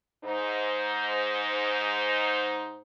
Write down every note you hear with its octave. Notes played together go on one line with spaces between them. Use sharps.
G#2 D#4 C5